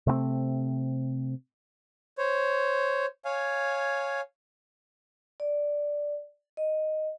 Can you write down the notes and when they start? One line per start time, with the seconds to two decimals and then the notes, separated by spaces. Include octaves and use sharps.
0.07 C3 A3 A#3 C4
2.18 C5 C#5
3.25 C#5 F5 G#5
5.40 D5
6.57 D#5